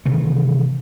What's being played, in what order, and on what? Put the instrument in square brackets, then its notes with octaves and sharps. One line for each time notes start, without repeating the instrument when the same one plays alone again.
[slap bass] C3 D#3 E3 A3